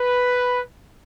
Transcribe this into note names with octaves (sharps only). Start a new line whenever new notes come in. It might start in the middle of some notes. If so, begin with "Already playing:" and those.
Already playing: B4